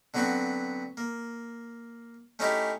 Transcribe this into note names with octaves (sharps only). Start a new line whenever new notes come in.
D3 F#3 B3 C4 F#4
A#3
A3 C#4 D#4 E4 G4 G#4